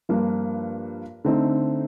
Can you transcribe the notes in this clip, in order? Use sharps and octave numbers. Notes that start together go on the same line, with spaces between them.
G2 F3 A#3 F4
D3 A3 C4 D#4